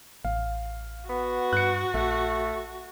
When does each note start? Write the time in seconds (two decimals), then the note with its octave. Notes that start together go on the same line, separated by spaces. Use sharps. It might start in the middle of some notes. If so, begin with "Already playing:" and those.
0.25 A1 F5
1.09 B3 F#4
1.53 G2 F#6 C#7
1.94 A#1 A3